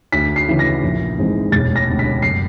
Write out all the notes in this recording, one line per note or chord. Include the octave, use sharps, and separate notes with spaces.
D2 B6
C7
C#3 E3
A#6
A#1
G#2 E3 G#3 C4
E1 A6
A#6
D2 C3
B6
F#1 C7